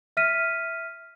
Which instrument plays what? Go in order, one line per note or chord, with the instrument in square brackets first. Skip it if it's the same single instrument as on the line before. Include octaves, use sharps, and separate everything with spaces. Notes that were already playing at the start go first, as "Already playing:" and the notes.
[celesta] E5 F6 B6 D#7